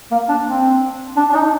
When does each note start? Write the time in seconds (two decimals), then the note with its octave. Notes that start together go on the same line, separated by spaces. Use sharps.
0.11 A#3
0.29 D4
0.47 C4
1.16 D4
1.29 D4
1.34 D#4